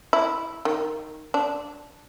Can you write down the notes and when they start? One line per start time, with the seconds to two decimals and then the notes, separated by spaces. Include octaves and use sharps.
0.13 E4
0.65 D#3
1.34 D4